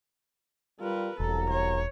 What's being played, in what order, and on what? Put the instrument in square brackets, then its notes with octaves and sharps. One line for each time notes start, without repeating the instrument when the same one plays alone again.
[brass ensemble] G3 F4 [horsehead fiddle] A#4 B4
[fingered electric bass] E1 [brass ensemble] C2 F#3 A#5 [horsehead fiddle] A4
[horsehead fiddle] C#5